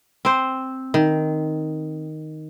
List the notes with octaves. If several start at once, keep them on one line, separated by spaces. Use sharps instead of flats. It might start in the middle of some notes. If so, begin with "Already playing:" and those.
C4 C5
D#3